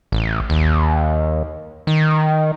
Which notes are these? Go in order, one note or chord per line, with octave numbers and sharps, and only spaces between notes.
A1
D#2
D#3